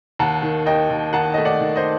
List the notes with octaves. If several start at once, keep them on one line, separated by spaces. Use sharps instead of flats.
D#2 F#5 A5
D#3
D#2 D#5 G5
D#2
D#3 F#5 A5
A3 D#5
D5 F#5
D#3
C5 D#5